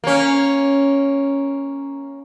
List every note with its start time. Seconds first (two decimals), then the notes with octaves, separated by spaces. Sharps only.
0.04 A#3 C#4